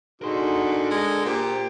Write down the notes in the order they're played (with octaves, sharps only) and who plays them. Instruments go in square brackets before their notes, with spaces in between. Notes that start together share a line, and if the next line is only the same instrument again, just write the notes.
[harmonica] D3 [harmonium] D#4 F#4 G#4 [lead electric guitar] A#4 C6
[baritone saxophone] G#3
[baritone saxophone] A#2 [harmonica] G4 [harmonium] C5